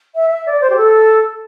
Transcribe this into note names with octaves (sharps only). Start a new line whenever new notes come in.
E5
E5
D5
C5
G4
A4